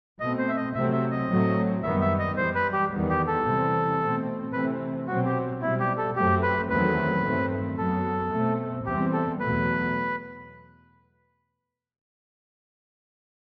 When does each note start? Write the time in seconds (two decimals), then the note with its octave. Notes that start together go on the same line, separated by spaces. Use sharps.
0.20 B2 A3 C4 D#5
0.38 C5
0.49 E5
0.56 D#5
0.74 C3 F#3 A3 C4 E5
0.92 E5
1.11 D#5
1.28 A2 F#3 A3 C4
1.82 F#2 D#3 G3 B3 E5
2.01 E5
2.19 D#5
2.36 F#2 E3 G3 C5
2.55 B4
2.73 G4
2.91 E2 D#3 G3 B3
3.09 G4
3.27 A4
3.44 C3 E3 G3 C4
3.99 B2 A3 C4
4.53 C3 E3 A3 C4 B4
5.07 B2 F#3 C4 F#4
5.25 G4
5.61 B2 G3 C4 E4
5.80 G4
5.98 A4
6.16 F#2 F#3 A3 C4 G4
6.42 B4
6.69 E2 D#3 F#3 A3 C4 B4
7.23 G2 D#3 A3 C4
7.77 F#2 F#3 B3 A4
8.32 B2 A3 C4
8.86 E2 C3 E3 G3 C4 G4
9.13 A4
9.40 E2 B2 F#3 A3 B4